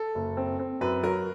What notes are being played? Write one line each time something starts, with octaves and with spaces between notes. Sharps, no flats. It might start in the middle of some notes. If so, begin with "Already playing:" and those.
Already playing: A4
F#1
C4
C4
F#2 B4
F#3 A#4